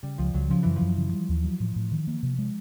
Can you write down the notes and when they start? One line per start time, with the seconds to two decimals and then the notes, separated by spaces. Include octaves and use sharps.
0.02 C#3 G3
0.18 C#2 F3
0.34 C#2 F#3
0.50 C#3 F3
0.63 F#2 E3
0.76 F3
0.81 F#2
0.97 C#3
1.13 G3
1.29 D#2
1.44 F#3
1.60 A2
1.76 A2
1.91 D#3
2.07 A#3
2.23 C3
2.38 G#3